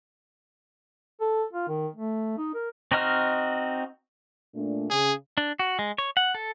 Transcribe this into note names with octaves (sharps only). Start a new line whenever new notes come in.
A4
F4
D#3
A3
D#4
A#4
C4 D#4 F#4 D#5 F6
A#2 A3 D4
C#3 G#4
D4
F#4
G#3
C#5
F#5
A4